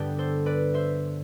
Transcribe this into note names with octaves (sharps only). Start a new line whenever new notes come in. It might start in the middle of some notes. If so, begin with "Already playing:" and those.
Already playing: G2 D3 G3 B3 D4 G4
A4 C5
B4 D5
C5 E5